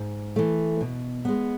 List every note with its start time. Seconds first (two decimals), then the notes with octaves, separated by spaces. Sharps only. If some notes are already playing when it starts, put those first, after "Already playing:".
Already playing: G#2
0.36 E3 A3
0.81 B2
1.25 G#3 B3